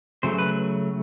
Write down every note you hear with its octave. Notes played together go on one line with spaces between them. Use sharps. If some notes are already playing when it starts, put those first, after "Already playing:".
C#3 F#3 A3 C5
B4